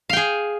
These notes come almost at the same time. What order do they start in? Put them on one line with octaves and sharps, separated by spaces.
F5 G5 G#4